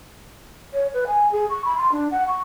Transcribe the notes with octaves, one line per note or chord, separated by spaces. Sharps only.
C#5
B4
G#5
G#4
C#6
B5
C6
D4
F#5
C#6